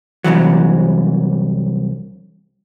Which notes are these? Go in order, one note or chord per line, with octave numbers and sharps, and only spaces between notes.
C2 G2 E3 F#3